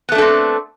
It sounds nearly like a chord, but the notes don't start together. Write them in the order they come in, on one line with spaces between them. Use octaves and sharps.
B3 A3 D4 A4 C4